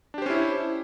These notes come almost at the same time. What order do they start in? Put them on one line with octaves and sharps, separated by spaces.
D4 G4 C5 C#4 E4